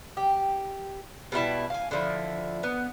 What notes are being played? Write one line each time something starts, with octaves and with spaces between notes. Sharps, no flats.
G4
B2 G3 E4 A5
F5 G#5
D3 F3 E4
B3